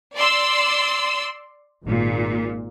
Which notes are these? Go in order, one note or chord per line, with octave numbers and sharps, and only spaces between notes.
D5 C6 E6
G#1 A#2